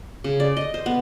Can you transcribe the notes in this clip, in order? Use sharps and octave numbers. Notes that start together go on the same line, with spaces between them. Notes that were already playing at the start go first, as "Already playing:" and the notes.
C#3
D5
D#5
C5
B3